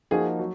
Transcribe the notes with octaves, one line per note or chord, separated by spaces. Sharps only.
F3 A#3 D#4 F#4 G#4
F#3